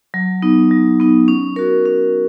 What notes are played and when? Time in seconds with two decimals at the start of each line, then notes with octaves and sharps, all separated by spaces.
0.14 F#3
0.42 B3 D#4
0.71 F#3
1.00 B3 D#4
1.28 C#4
1.56 F#4 A#4
1.86 C#4